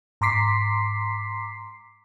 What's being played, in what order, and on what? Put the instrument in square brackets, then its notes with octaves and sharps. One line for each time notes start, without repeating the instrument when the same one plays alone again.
[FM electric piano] G#2 A#5 C6 D6 B6 C7